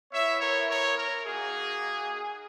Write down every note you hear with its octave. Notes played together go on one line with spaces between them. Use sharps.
B3 E4 C#5 E5
A#4 C#5
A#4 C#5
A#4
A#3 D#4 F#4 G#4